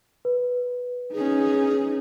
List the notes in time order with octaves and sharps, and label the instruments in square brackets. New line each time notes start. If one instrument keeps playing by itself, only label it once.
[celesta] B4
[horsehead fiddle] C#4 D#4 [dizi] G#4